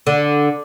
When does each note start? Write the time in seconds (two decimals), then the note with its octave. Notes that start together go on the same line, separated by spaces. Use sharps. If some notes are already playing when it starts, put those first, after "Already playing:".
0.07 D3